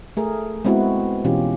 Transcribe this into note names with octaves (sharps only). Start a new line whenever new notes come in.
A3 G#4 A#4
G#3 B3 C4 E4 F#4
B2 E3 C#4 F4 G4